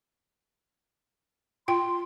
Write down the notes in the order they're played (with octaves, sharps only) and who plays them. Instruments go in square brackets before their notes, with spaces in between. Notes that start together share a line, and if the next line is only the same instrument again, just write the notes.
[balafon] F4 G5 [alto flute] C6